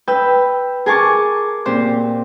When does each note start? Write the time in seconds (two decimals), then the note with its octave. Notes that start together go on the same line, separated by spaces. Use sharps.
0.08 B4 G5 E6
0.86 G#4 A#4 G#5 A5 C#6 D6
1.66 A#2 C4 G4 C5